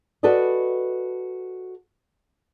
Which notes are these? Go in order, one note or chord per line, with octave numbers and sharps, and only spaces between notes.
F#4 A4 B4 D5 D#5